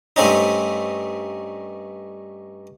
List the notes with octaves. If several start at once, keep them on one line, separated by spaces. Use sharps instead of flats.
G2 A3 C4 C#4 D#4